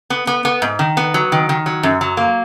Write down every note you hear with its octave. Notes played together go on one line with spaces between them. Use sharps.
B3
B3
B3
G#2
D#3
B3
F#3
D#3
D#3
F#3
F#2
F#3
A#3